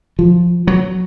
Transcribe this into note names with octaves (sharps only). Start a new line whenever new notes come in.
F3
F#3